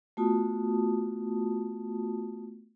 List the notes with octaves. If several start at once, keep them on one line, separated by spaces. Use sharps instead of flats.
A3 B3 F4 F#4 A5 D#6